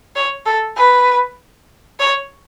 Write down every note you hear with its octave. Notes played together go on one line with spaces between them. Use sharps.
C#5
A4
B4
C#5